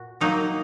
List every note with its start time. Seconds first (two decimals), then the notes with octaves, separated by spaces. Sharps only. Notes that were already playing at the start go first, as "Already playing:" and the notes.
Already playing: A#2 F#4
0.21 D#3 F#3 A#3 D#4